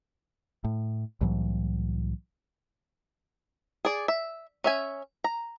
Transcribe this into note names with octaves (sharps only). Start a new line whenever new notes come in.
A2
C2 A2 E3 F#3
G#4 D5
E5
C#4 E5 G#5
A#5